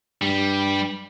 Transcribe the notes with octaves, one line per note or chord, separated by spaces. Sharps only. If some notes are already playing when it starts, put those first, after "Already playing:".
G2 G3